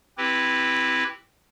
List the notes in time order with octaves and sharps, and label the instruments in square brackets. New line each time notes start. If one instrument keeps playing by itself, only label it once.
[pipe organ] C4 E4 G4 B4